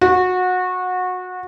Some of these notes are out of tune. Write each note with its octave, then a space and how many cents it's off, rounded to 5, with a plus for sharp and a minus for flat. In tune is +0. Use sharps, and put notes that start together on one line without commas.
F#4 -25